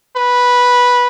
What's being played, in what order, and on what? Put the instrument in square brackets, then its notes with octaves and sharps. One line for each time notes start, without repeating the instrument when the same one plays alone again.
[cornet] B4